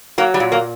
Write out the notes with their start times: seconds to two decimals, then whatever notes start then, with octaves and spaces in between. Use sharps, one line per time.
0.18 F#3 A#3
0.34 G3
0.40 A#2
0.52 A#3